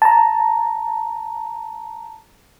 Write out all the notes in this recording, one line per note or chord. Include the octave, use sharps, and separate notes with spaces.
A5 A#5